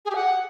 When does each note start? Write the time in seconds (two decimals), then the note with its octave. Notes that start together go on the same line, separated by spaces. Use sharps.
0.05 G#4
0.10 G4
0.15 F#5